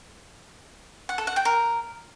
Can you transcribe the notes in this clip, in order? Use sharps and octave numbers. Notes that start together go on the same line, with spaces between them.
F#5
A4
F#5
G5
A#4